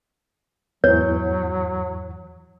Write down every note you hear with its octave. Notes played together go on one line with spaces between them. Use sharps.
E2 G#2 E3 F#3 C#5